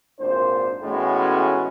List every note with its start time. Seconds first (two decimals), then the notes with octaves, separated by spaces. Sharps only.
0.20 G#1 A#2 D4 C5
0.83 A1 A2 G#3 B3 C#4 F#4